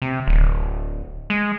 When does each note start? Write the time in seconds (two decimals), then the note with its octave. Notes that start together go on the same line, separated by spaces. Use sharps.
0.02 C3
0.28 D1
1.30 G#3